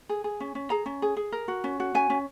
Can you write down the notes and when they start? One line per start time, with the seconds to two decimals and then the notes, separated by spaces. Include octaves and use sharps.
0.09 G#4
0.24 G#4
0.40 C#4
0.55 C#4
0.70 G#4 A#5
0.86 C#4
1.02 G#4
1.17 G#4
1.32 A#4
1.48 F#4
1.64 C#4
1.80 F#4
1.94 C#4 G#5
2.10 C#4